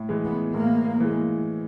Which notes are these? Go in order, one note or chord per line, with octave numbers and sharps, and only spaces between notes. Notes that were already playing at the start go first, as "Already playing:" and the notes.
Already playing: A2
E3 G#3
B3
A2 A#3
E3 G#3